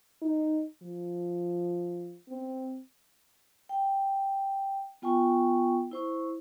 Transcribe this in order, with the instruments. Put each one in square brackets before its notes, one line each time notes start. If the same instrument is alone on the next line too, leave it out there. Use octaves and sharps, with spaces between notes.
[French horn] D#4
F3
C4
[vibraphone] G5
B3 F4 G5 G#5 C#6
E4 C5 C#6